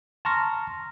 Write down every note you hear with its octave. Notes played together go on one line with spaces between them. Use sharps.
A5 A#5 C6 C#6 F6 A#6